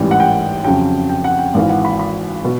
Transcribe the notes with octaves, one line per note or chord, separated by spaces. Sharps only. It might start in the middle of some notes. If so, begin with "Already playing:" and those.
Already playing: A1 G#2 E3 G3
F#5
G5
F2 C#3 F#3 G5
G5
F#5
G5
G#1 G#2 E3 F5
F#5
B5
B5
B2